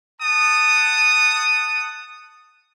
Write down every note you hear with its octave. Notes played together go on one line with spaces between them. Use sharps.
F#5 A5 D#6